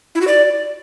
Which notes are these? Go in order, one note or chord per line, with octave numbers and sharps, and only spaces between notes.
E4
F#4
D5